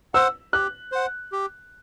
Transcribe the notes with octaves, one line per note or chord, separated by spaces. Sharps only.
C5 F#5 E6
G4 F#6
C5 F#5
G4